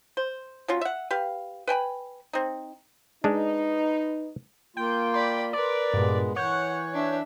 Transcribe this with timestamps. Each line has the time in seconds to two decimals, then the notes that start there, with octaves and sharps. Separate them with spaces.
0.17 C5
0.68 F#3 C#4 F4
0.81 E5 F#5
1.11 G4 B4 F5
1.67 B4 G5 G#5 B5
2.33 C4 D#4
3.24 G#3 D4 D#4 B4
4.77 A#3 F4 G5
5.14 D5 B5 C6
5.53 A#4 B4 D5
5.94 G2 A#2 G#3 B3
6.36 E3 C#5 F#5 F#6 G6
6.93 D4 E5